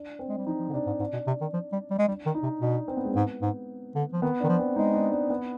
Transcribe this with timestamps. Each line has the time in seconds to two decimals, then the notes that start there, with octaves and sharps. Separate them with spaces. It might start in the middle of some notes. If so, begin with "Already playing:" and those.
Already playing: D4
0.19 C4
0.29 G#3
0.38 G3
0.47 F3 D#4
0.59 F3
0.69 D3
0.73 C3 D4
0.87 G#2
1.00 G#2 D4
1.13 B2
1.27 C3
1.41 D#3
1.54 F3
1.72 G3
1.90 G3
1.99 G#3
2.08 G3 D4
2.26 D#3
2.35 D#4
2.43 C3
2.61 B2 D4
2.88 C4
2.97 B3
3.05 G#3
3.13 G#2 B3
3.42 G#2
3.95 D3
4.13 F3
4.22 D#3 B3
4.40 D#3 D4
4.49 F3
4.59 C4
4.76 G#3 D#4
4.94 D4
5.12 D4
5.30 B3